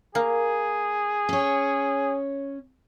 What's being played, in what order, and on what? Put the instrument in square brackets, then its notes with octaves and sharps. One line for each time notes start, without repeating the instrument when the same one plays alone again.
[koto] A#3 [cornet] G#4
[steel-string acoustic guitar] C#4 C#5